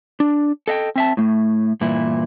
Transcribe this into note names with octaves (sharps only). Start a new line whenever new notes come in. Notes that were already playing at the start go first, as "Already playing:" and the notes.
D4
A4 D#5 E5 G5
C4 E5 A5
A2 A3
G2 A#2 E3 E4